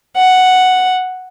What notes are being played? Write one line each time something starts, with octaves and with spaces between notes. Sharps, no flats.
F#5